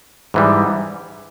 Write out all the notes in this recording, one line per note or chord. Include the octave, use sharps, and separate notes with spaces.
G#2 E3 G3